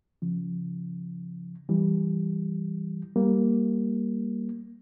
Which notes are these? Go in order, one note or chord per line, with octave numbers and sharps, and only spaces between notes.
C#3 F3
E3 G3
G3 A#3